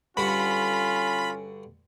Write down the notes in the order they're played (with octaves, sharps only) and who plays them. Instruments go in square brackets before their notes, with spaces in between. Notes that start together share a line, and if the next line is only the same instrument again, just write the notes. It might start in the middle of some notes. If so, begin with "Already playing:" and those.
[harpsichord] G2 D3 F#4 [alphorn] C#4 [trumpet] F4 [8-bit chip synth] B5